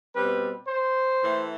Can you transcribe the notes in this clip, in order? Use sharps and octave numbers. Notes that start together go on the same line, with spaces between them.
B2 G3 C4 B4
C5
A2 E3 A3